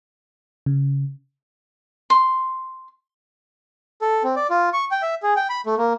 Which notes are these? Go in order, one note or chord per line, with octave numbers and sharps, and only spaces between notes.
C#3
C6
A4
C4
D5
F4
C#6
G5
E5
G#4
G5
B5
A3
A#3